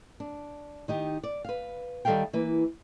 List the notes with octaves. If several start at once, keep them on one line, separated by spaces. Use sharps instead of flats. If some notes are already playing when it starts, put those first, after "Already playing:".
D4
D#3 D#4 G4
D5
B4 F5
D#3 G3 A4 E5 F5 G5
E3 A#3 B4